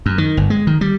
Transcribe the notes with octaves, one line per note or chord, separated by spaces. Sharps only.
F#2
D#3
G1
G#3
D#3
G3